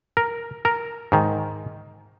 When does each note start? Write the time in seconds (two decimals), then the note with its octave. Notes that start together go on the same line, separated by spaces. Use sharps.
0.17 A#4
0.65 A#4
1.12 G#2 D#3